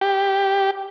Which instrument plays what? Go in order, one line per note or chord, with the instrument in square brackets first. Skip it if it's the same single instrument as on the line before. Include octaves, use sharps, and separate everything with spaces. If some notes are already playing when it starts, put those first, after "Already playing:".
[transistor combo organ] G4